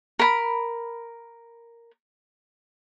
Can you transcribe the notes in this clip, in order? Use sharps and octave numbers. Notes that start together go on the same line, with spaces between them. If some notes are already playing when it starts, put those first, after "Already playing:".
A#4 B5